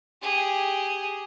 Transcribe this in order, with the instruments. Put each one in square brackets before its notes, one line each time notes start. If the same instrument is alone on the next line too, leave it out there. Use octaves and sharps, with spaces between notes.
[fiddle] G4 G#4